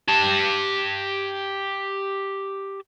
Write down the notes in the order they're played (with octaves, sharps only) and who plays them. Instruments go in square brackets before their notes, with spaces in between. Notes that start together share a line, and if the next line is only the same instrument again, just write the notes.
[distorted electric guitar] G4 A5